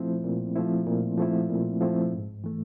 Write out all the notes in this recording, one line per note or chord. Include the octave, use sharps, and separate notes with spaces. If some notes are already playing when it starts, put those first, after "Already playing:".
Already playing: A#2 F3 A3 C4 E4
A#2
F3 A3 C4 E4
A#2
F3 A3 C4 E4
A#2
F3 A3 C4 E4
G#2
E3 A3